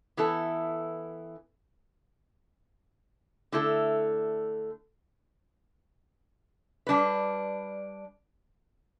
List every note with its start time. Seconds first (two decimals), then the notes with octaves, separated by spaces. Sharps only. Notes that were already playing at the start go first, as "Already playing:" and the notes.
0.17 E3 B3 E4 A4
3.52 D3 A3 E4 A4
6.87 G3 D4 B4